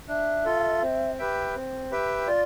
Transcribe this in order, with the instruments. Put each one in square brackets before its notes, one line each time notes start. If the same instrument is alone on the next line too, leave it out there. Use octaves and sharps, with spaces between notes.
[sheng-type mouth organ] D4 [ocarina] E5
[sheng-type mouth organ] F4 A4
C4
G4 B4 E5 G5
C4
G4 B4 E5 G5
[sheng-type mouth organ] F4 [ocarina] D5